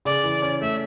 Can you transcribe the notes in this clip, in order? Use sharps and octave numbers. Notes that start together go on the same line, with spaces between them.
C#3 D5
E3
C#4
A3 E5